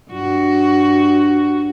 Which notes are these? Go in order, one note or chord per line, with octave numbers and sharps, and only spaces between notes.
G2 F#4